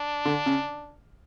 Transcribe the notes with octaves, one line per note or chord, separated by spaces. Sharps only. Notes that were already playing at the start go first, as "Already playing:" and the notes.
Already playing: D4
D3
C#3